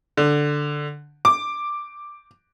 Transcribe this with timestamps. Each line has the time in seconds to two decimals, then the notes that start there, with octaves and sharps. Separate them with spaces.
0.17 D3
1.25 D6